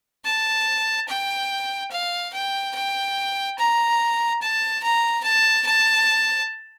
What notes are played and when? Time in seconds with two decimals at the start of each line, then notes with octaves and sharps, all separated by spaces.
0.25 A5
1.08 G5
1.91 F5
2.33 G5
2.75 G5
3.58 A#5
4.42 A5
4.83 A#5
5.24 A5
5.66 A5